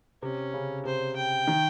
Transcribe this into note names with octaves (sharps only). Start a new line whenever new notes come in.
C3 C#4
C#3
C3 C5
G5
D#3